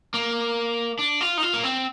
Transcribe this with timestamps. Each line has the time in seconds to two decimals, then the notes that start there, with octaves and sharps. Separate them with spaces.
0.14 A#3
0.99 D4
1.21 F4
1.38 D#4
1.43 F4
1.54 A#3
1.64 C4